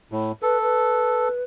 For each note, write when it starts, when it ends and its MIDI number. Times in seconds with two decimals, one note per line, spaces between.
0.12 0.32 45
0.42 1.28 69
0.42 0.61 71
0.62 1.42 71